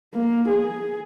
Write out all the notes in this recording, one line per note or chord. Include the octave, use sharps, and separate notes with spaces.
A#3
G#4